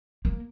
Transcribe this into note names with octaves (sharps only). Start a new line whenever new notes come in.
A#3